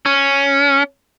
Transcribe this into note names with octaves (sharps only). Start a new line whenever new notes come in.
C#4